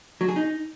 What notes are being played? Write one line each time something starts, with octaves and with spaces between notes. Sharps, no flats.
F#3
G#4
D#4